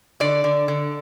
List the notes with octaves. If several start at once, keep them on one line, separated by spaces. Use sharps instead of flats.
D3 D5
D3
D3